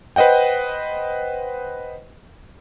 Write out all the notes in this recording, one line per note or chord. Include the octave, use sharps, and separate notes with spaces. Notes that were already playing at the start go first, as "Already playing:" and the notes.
B4 C5 D#5 F#5 G5